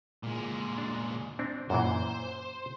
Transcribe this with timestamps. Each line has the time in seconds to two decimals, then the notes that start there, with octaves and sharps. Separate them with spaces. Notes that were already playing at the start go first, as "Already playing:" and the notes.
0.23 A#2 G#3
0.78 D4
1.39 C4 D4
1.70 F#2 A#2 E3 C5